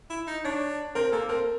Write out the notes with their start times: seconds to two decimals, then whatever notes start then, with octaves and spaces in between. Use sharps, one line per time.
0.10 E4
0.27 D#4
0.44 D4 C#5
0.95 C4 A#4
1.12 A#3 A4
1.29 C4 A#4